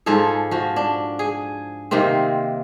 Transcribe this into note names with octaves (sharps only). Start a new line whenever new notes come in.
G#2 F3 G#4 A4
F3 F#4
D4
G#4
C3 D#3 A#3 C4